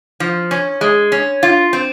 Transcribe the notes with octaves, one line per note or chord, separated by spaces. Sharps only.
F3
C#4
G#3
C#4
F4
C4